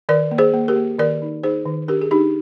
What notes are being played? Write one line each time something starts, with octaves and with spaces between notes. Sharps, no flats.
D#3 A#4 D5
A#3
G#4 C5
A#3
G4 A#4
A#3
D#3 A#4 D5
D#4
D#4 G#4 C5
D#3
D4 G4 A#4
G#4
D4 D#4 G4